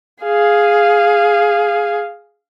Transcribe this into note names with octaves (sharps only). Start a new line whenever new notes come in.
G#4 F5